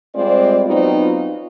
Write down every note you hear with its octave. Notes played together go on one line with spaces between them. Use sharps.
G3 G#3 C4 F4 C5 D5
F#3 B3 C4 D#4 F4